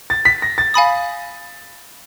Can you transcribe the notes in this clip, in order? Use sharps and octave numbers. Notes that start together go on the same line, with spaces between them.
A6
B6
A#6
A6
F5 G#5 B5 D#6